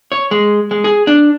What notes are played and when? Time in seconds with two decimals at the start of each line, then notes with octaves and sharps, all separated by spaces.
0.12 C#5
0.31 G#3
0.71 G#3
0.84 G#4
1.07 D4